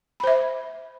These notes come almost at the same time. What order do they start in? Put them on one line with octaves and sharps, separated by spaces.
B5 C5 E5